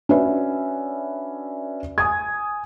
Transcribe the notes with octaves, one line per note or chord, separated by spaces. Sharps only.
C#4 D4 F#4 B4 E5
G#5 D#6 G#6